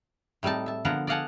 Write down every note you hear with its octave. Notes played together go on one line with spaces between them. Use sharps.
A2 G3 C4 D#4 A5
E5 A5
D3 F3 B3 A#4 F#5
D5 D#5 F5 F#5 G#5 A5